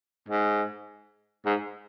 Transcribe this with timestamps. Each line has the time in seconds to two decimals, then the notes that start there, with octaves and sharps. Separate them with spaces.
0.29 G#2
1.46 G#2